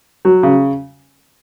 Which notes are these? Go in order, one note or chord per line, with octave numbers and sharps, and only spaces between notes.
F#3
C#3